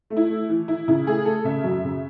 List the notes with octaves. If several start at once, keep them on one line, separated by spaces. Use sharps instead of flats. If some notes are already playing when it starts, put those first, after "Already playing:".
A3
E4
A3
E3
E3 E4
C#3 E4
A3 G#4
A3 A4
C#3 E5
F#2
C#3